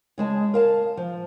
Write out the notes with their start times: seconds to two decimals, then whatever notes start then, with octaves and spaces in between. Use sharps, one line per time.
0.18 C#3 G#3 A5
0.54 A#4 F5 A5
0.97 F3